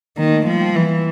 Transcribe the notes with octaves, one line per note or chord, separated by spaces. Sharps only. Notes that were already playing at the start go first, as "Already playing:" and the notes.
D#3 A#3
A3
F3 G3
G3
E3